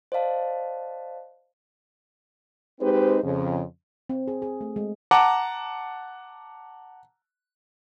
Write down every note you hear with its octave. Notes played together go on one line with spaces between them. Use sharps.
C5 D5 D#5 F5 A5
G#3 C4 D#4 G4 B4 C5
F2 C#3
C4
G#4
G#4
A3
G#3
F#5 A5 A#5 D6